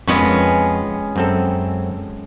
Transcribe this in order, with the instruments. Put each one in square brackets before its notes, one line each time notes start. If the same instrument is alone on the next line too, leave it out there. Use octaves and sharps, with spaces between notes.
[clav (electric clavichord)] F2 [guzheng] G#3 B3 C#4
[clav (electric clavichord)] F#2 C4 A4